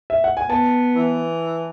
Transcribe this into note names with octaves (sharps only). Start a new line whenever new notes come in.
E5
F#5
G#5
B3 A5
E3